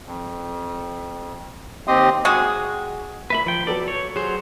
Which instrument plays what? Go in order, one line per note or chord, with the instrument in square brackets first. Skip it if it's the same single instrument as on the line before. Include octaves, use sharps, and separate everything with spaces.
[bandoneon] F2
D#2 C4 G4 D#5 C6 D#6
[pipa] G#3 F#4 G#4
[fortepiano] A#2 A#3 [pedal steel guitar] B4 E5 B5
[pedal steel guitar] F3 G5
[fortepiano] F#3 B3 A4 [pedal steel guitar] D5
[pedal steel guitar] C#5
[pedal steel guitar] F#3 C5 [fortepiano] G#4